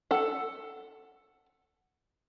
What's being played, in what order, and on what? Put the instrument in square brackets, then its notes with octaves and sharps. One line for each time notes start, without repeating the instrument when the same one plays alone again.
[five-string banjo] A4 F#5